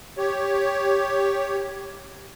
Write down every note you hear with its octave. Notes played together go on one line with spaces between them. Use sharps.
G4 C#5